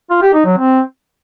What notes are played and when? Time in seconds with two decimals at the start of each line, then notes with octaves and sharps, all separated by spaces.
0.11 F4
0.22 G4
0.34 D#4
0.46 F#3
0.57 C4